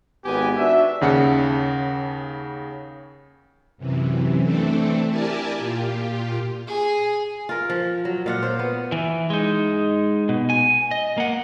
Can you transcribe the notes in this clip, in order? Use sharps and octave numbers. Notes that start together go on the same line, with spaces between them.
G#1 B3 G4 G#5
D4 F#4 E5
D#2 C#3 F#5 A5 C#7
F#2 C3 E3
E3 A3 C4 D4 A4
E4 G4 A#4 D5 G#5 A5
A#2 F4 G4
G#4
F4 A#4
F3
F#3
A#2 F4 F#5
C5
B3
E3
G#3 D#4
B2
G#5
D#5
A#3 F#5